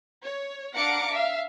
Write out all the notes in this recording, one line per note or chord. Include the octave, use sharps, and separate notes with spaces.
C#5
D4 F5 F#5 A#5 D6 C#7
E5 F5